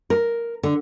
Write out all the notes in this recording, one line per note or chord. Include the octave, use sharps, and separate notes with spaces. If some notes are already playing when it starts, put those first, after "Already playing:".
A#4
D3